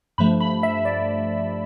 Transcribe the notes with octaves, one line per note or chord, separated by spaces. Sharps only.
G2 F3 A3 B5
B5
E5
D5